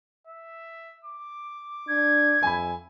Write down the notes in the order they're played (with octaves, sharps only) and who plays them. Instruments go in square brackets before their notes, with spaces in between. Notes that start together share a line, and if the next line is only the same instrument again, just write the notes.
[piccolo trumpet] E5
D6
[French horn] D4 [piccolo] G#6
[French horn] F2 [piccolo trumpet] E5 [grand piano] G#5 B5